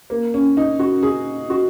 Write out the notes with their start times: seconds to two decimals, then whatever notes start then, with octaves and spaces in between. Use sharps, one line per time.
0.10 A#3
0.34 C#4
0.57 D#4
0.79 F#4
1.03 G#4
1.50 F#4